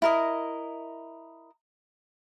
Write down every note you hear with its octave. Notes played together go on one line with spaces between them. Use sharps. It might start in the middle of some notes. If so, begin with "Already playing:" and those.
E4 A#4 D#5